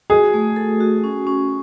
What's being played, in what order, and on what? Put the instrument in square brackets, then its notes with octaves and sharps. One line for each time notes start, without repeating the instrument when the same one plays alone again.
[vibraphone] F#4 [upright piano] G#4
[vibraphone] A3
A4
F#4
C#4
C#4